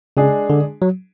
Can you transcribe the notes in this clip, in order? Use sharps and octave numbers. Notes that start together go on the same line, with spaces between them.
C#3 G#3 D4 G#4
D3
F#3